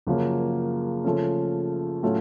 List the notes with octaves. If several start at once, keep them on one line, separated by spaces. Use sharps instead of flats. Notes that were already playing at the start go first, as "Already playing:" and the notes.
F#2 C#3 F3 A#3
C#3 F3 A3 C#4
A2 F#3 A3 C#4 F4